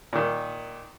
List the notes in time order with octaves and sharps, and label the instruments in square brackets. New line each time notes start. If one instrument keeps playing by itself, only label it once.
[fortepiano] A#2 D#3